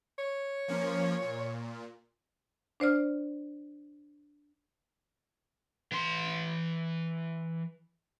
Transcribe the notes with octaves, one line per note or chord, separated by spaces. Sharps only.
C#5
F3 A#3 C#4
A#2
D4 C5 D5 F6
E3 C6